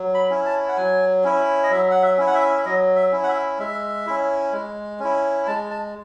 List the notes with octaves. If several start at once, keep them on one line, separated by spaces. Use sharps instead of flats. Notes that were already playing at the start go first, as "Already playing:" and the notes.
Already playing: F#3
B5
C#4 E4
A5
F#5
F#3 G#5
C#4 E4
D#5
F#3 E5
F#5
E5
C#4 E4
F#5
E5
E5
F#3 D#5
E5
C#4 E4
F#5
E5
G#3 E5
C#4 E4
G#3
C#4 E4
G#3 A5
A5